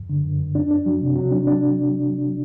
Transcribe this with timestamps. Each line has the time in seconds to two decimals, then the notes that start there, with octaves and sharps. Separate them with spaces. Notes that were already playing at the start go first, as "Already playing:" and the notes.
Already playing: F#2
0.09 D3
0.25 F#2
0.40 F#2
0.55 D4
0.71 D4
0.86 F#3
1.01 C3
1.15 F#3
1.31 D4
1.47 D4